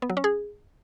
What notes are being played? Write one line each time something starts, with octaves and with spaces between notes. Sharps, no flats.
B3
F#3
C#4
G#4